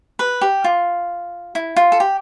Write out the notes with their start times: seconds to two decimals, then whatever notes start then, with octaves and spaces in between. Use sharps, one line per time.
0.19 B4
0.41 G4
0.64 F4
1.55 E4
1.76 F4
1.92 A4
2.00 G4